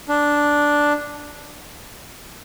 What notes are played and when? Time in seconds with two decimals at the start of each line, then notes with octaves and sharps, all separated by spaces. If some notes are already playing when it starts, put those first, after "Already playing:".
0.09 D4